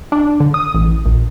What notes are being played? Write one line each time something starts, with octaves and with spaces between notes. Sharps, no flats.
D4
D3
D#6
A1
A#1